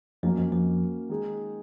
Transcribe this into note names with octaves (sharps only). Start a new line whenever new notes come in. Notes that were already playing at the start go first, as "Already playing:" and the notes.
F2 F3 F#3 A#3 C#4
F2 F3
F2 F3
D#3 G#3 D#4 G#4